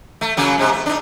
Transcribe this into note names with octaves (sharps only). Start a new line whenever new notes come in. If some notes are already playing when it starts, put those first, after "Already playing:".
A3
C#3 F#3 A#3
G#2 C3 C4
A3
D4 D#4